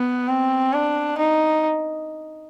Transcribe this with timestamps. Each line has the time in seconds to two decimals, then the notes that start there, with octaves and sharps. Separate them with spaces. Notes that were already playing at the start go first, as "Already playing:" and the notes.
Already playing: B3
0.29 C4
0.73 D4
1.18 D#4